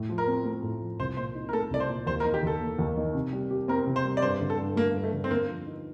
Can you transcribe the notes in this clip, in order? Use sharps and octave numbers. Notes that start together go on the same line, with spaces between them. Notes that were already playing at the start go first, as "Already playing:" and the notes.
Already playing: A2
F3
A#4
C4
A3
A2
F3
C2 C5
A#2 C5
D#4
A#4
A3 A4
C2 D5
C5
A#2
D#2 C5
A#4
D#3
G4
D#2 A4
A#3
D#2
D#3
C3
G3
G4
C4 A#4
C3
C5
G3
D5
G2 C5
D3
A4
G2
A3 A#3
G2
A3
D3
C4
D3 A#3
F3
D#4